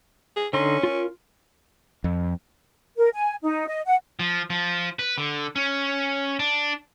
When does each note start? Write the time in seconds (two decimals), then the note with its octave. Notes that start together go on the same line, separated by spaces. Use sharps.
0.37 G#4
0.53 D3 C#4 D#4 C6
0.83 F4 A#4
2.04 F2
2.98 A#4
3.13 G#5
3.42 D#4
3.67 D#5
3.86 F#5
4.20 F3
4.50 F3
4.99 B4
5.18 D3
5.56 C#4
6.39 D4